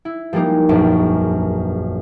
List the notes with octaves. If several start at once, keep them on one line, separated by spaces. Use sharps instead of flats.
E4
F3 G3 G#3 A#3 D#4
E1 A#1 F#2